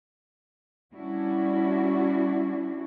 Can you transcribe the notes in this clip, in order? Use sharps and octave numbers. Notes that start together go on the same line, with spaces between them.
G3 C#4 D4 E4 F#4